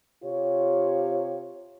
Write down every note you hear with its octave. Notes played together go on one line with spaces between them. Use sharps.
C3 F4 G4 C#5